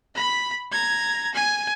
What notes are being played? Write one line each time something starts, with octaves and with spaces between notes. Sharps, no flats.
B5
A#5 G#6
G#5